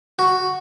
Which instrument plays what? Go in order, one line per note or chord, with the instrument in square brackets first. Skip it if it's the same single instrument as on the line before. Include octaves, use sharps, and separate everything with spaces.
[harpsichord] F#4